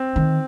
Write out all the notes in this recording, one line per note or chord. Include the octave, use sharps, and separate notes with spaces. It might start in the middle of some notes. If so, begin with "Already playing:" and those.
Already playing: C4
D#3